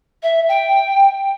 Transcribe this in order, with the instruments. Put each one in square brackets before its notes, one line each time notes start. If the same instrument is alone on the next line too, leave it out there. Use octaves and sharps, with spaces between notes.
[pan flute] E5
G5